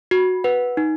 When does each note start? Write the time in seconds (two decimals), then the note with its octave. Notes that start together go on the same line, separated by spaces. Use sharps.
0.11 F#4
0.44 B4 F#5
0.77 D#4